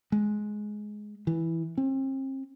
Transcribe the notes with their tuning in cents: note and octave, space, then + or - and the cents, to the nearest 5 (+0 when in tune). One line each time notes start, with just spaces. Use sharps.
G#3 +10
E3 -5
C4 +40